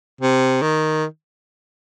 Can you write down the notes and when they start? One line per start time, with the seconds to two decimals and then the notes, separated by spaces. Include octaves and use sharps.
0.21 C3
0.62 D#3